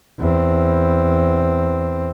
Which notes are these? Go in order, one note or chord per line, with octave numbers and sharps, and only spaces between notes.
E2 C4